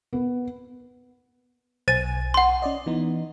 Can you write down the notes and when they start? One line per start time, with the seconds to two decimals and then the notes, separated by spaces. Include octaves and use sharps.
0.13 B3
1.88 B1 C5 G#5 A6 D#7
2.34 F#5 C6
2.62 C#4 D5 D#5
2.86 E3 B3 D#4